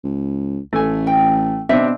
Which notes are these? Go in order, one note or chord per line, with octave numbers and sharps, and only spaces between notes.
C#2
A1 A3 G#5
G5
B2 C4 D4 E5